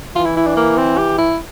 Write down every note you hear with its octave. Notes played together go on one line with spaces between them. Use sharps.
E3 F4
E4
E4
D4
A#3
C4
G4
E4